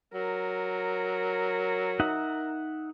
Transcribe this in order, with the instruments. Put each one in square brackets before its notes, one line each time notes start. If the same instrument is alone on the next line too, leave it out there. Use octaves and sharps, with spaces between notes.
[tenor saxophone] F#3 [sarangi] A#4
[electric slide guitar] D#4 E5 F#5